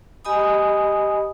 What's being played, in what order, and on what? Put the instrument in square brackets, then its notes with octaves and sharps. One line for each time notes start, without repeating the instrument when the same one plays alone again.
[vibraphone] G4 D#5 G#5 B5 D#6